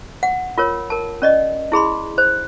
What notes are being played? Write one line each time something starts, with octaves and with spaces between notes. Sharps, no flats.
F#5
F4 A#4 C#5
A#4 A5
C#4 D5 D#5
E4 G#4 B5 C6
C5